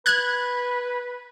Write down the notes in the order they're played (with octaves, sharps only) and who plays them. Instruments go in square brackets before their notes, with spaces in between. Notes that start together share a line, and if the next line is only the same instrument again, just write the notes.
[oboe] B4 [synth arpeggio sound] F#6 G#6